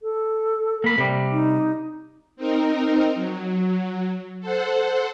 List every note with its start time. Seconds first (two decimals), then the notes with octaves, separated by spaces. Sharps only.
0.02 A4
0.84 A#3 B5
0.98 C3 G3
1.32 D#4
2.36 C4 D#4 A#4
3.15 F#3
4.40 A4 C5 F#5